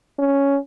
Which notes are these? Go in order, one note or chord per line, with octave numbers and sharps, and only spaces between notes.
C#4